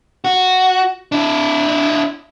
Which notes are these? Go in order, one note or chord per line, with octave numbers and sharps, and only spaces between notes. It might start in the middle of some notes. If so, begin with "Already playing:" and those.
F#4
D4 E4